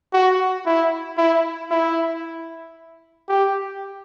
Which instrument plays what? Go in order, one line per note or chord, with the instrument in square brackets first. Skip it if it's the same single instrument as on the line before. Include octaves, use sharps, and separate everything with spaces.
[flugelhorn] F#4
E4
E4
E4
G4